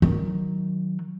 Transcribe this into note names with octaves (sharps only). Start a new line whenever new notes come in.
D#3 F#3